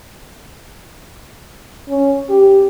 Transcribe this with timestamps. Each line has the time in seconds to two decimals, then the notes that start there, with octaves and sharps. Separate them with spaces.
1.89 C#4
2.29 G4